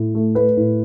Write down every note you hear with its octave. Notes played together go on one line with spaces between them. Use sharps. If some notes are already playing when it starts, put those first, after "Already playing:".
Already playing: A2
A3
A3 B4
A2